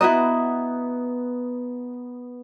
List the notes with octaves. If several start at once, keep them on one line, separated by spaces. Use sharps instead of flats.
B3 E4 F#4 D#5 A#5 D#6